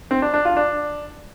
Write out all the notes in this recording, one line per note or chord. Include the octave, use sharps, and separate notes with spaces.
C4
D4
D4
F4
D4